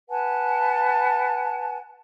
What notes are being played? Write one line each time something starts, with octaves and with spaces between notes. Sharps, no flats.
B4 F#5 G#5 A5